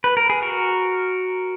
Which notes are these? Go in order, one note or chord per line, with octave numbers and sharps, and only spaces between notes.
B4
A#4
G#4
F#4 A#4